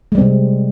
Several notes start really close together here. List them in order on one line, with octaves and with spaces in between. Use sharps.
G#3 G3 C4 C3